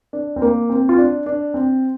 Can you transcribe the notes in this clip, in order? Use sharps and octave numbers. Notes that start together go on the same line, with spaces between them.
D4
C4
A#3
C4
F4
D4
D4
C4